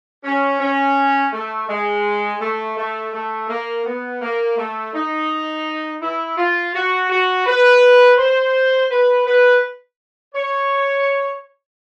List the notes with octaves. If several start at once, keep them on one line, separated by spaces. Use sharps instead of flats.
C#4
C#4
A3
G#3
A3
A3
A3
A#3
B3
A#3
A3
D#4
E4
F4
F#4
F#4
B4
C5
B4
B4
C#5